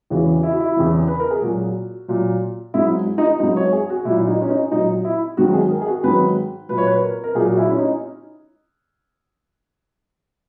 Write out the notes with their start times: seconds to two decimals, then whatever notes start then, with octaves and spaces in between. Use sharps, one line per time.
0.10 E2 C#3 E3 F#4
0.43 E4
0.51 F#4
0.60 E4
0.76 E2 C#3 E3
1.08 B4
1.19 A#4
1.31 G#4
1.42 A#2 F#3 F#4
2.08 A#2 F#3
2.74 G#2 F#3 E4
3.18 D#4
3.40 G#2 F#3 D#4
3.56 C#5
3.73 G#4
3.89 F#4
4.05 A#2 F#3 E4
4.27 D#4
4.42 C#4
4.50 D#4
4.72 A#2 F#3 D#4
5.05 E4
5.37 G#2 D#3 F#3 F#4
5.54 G#4
5.71 A#4
5.82 G#4
5.87 F#4
6.03 G#2 D#3 F#3 B4
6.69 A#2 F#3 B4
6.78 C#5
6.87 B4
7.02 A#4
7.24 A#4
7.35 A#2 F#3 G#4
7.52 F#4
7.57 E4
7.69 C#4
7.79 D#4